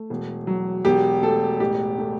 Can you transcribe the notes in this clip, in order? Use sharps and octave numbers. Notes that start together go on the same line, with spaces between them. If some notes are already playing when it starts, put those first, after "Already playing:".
Already playing: A3
E1
F#3
E1 G4
A3 A4
A1 G4
A3